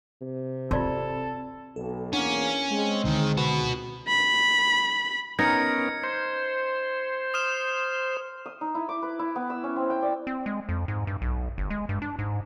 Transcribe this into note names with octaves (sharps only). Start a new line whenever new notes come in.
C3
C4 F4 A4 D5 C6
B1 A4
E2 A#3 C#4 D4 F#5 B6
G#3 C4
C#2 D3 D#3
F#4 B4
B5
B3 C#4 D#4 A#4 G#6 C#7
C5 C#7
D#6 F6 E7
D#6
D#4
E4
D6
B4
E4
B3
E6
C#4
C4
G5
D5
C4
G#3
F2
G#2
G2
B1
G1
G#3
G2
D4
G#2